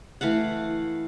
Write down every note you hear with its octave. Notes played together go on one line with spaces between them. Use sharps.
E3 A3 F5 F#5